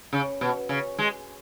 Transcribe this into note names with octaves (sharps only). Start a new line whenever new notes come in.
C#3
B2
C#3
G#3